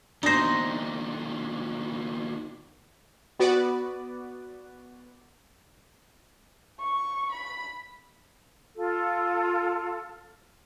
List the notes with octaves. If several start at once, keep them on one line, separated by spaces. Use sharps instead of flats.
D#2 B2 D4 D#4 C5 A#6
B3 F#4 B4 D5
C#6
B5
F4 A4